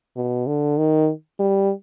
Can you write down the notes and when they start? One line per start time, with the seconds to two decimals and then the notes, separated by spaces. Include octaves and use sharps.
0.16 B2
0.47 D3
0.78 D#3
1.39 G3